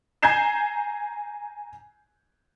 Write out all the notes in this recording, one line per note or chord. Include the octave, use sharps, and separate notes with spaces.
G#5 A#5 G6 G#6 C7 E7